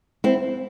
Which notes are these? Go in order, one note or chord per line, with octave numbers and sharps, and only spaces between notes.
C4 E4